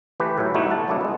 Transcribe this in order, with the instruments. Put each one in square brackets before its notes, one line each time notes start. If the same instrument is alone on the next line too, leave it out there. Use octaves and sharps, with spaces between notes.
[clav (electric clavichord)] E3 A3 G4 B4
A2 F#3 E4
G3 A3 B3 D#4 E4 F#4
F#5 A5
F#3 A3 A#3 D4 E4
G#3 B3